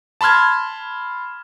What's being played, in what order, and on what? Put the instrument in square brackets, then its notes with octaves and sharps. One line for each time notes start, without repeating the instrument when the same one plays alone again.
[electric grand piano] A5 B5 C6 F6 G#6